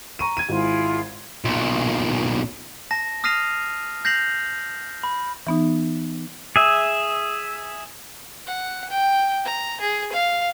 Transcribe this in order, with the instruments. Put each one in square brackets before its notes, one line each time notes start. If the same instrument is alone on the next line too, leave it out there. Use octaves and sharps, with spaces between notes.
[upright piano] A#5 C#6 D#7
G#6 D#7
[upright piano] G#1 [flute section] E4 F4 G#4
[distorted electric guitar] B1 A#2
[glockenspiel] A5 A#6
D#6 F6 A#6 C7 D#7 F7
G6 A#6 C7 F7 F#7
B5
[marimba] E3 B3 D#4
[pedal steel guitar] G#4 E5
[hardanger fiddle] F#5
G5
A#5
G#4
F5